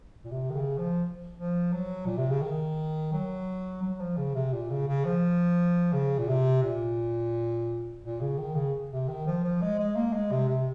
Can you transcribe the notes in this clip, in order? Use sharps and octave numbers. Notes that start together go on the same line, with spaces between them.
A#2
C3
D#3
C#3
F3
F3
F#3
A#2
C3
C#3
D#3
F#3
F#3
F3
C#3
C3
A#2
C#3
C#3
F3
C#3
A#2
C3
A#2
A#2
C#3
D#3
C#3
C3
D#3
F3
F3
G#3
G#3
A#3
G#3
C3
C3